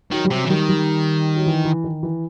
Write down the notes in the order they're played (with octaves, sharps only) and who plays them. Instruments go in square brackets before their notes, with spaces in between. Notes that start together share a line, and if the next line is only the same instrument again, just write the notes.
[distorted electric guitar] D#3 [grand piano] F#3
[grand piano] G3
[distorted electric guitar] C3 [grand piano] F#3
[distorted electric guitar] E3
[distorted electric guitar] D#3 [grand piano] G3
[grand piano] G3
F#3
E3
E3
D#3
E3